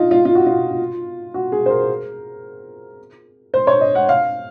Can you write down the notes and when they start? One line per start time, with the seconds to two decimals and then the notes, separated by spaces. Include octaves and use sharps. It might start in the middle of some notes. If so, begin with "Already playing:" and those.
Already playing: D#4 F4
0.11 F4
0.25 F4
0.35 F#4
0.46 F4
1.34 F#4
1.52 G#4
1.66 C5
1.70 A#4
3.54 C5
3.67 C#5
3.81 D#5
3.95 F#5
4.09 F5